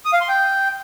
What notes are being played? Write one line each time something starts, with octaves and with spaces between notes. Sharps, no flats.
D#6
F5
C6
G5